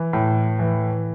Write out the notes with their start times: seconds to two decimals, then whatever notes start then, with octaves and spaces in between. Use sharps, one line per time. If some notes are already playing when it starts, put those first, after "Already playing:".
Already playing: E3
0.13 A2
0.59 E3